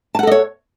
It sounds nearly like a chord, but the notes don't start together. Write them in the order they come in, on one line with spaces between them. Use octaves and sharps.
A5 F#5 A4 D#5 C#5